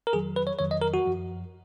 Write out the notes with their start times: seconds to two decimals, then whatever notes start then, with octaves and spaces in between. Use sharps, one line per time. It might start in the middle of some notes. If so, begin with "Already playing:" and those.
0.07 A#4
0.13 F2 D#3 F#3 G#4
0.36 B4
0.47 C#5
0.59 F2 D#3 F#3 C#5
0.71 D#5
0.81 A#4
0.94 F#4
1.06 F#2 F3